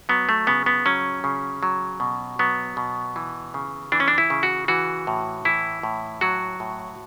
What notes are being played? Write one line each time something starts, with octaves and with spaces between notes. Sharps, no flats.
F#3 B3
A3
C#3 B3
B3
F#3 C#4
C#3
F#3
B2
F#3 B3
B2
E3
C#3
E3 D4
C#4
D4
E4
C#3
F#4
E3 F#4
A2
E3 E4
A2
F#3 F#4
A2